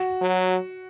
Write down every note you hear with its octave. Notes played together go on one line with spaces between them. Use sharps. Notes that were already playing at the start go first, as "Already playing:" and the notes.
Already playing: F#4
F#3